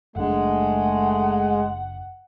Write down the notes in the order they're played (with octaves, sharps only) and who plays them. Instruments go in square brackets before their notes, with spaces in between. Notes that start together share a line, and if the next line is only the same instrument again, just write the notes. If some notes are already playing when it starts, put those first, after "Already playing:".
[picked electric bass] F#1 D4 [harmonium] G#3 [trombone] A3 [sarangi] F#5